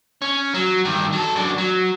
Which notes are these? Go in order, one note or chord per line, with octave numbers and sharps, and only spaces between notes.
C#4
F#3
G2 D#3
F#3 A4
F#2 D4
F#3